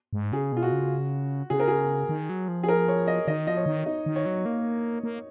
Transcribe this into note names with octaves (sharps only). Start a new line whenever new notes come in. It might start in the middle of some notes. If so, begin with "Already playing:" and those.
G#2
C#3 G#4
B2 F4
F#4
C#3
C#3 G#4
A#4
G#4
D#3
F#3
F3
G#4
A#4
C#5
D#5
D#3 D#5
F3 D#5
C#5
D#3
D#4
D#3
C#5
F#3
A#3
A#3